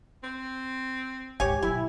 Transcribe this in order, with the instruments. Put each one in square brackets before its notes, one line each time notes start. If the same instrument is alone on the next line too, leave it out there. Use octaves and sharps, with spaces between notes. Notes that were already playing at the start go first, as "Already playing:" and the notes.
[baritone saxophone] C4
[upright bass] G#1 C#2 [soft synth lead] G4 [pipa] C#5 G#5
[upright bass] B2 F#3 [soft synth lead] E4 [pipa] G#5